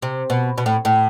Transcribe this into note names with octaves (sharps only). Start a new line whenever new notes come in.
C3
B2
B2
A2
A2